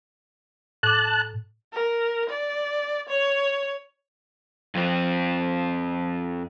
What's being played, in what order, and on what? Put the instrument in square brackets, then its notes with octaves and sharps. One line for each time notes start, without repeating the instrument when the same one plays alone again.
[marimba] A2 D6 [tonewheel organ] A5 F#6
[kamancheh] A#4
D5
C#5
[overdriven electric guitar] F2 C4